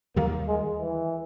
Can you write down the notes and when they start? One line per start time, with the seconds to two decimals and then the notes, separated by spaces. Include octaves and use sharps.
0.16 D#2 D#3 G3 A#3
0.47 G#3
0.79 E3